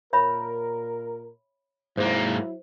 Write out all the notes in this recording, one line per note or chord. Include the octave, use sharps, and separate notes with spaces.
A#2 A#4 C#5 E5 B5
G#2 F#3 A#3 E4 C5